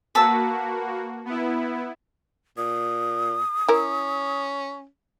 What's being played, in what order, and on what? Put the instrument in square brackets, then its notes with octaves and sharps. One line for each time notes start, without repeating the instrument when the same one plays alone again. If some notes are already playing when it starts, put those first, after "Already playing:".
[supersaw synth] A#3 F#4 [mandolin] B4 A5 E6
[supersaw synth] B3 E4
[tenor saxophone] A#2 [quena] D#6
[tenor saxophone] C#4 [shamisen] E4 A#4